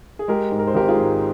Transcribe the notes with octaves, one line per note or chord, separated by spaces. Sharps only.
G#4
G#3 G4 A#4
G#2
A#4
C5
G#1 G4 A#4
F4 G#4
G#2